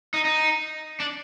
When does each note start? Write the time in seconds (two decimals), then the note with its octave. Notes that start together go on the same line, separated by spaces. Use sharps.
0.14 D#4
0.25 D#4
1.00 D4